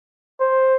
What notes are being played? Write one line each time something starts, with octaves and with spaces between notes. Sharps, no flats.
C5